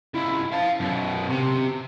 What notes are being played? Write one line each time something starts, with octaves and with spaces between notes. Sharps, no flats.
C#2 E4
F5 A5
F#2 B2
C3